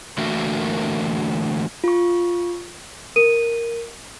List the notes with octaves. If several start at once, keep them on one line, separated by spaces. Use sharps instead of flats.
D3 E3 A3 A#3 F#4 A#4
F4 C#6
A#4 D#7